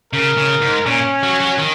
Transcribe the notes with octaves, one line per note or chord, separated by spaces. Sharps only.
C#3 A#4
C#3
G#2
A#2 C#4
F#3
F#3
D#3